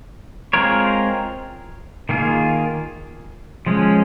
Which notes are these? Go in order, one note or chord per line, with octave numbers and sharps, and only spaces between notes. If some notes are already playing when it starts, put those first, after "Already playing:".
G#3 C4 F4 A#4 C#5
D#3 A#3 F4 G#4
F3 G#3 C#4